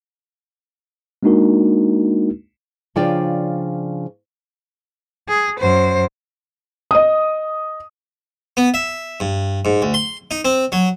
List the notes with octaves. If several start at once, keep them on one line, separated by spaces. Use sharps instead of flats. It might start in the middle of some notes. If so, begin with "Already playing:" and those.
G#3 A#3 D4 D#4 F#4 A#4
C#3 F3 D4 F4 D5 G5
G#4
F#2 C5
D#5 D#6
B3
E5
G2
G#2
D2
C6
D#4
C4
F#3